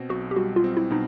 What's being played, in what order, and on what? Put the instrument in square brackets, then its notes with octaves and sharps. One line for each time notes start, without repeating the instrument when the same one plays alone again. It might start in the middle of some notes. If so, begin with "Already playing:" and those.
Already playing: [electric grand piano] B2 C4
[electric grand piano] B1 [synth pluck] F#4
[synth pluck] G4
[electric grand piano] G3 [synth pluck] F#4
[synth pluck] F4
[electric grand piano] C4
[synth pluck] E4
[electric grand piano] B2 [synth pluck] D#4